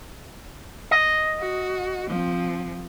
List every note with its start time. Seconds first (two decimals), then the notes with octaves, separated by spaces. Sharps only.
0.91 D#5
1.39 F#4
2.09 F3 C4